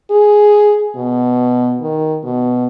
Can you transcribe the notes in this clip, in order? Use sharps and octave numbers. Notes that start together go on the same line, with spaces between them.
G#4
B2
D#3
B2